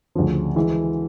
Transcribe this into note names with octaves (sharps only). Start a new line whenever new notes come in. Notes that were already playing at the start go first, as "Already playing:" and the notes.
D2 C#3 F3
E3 G#3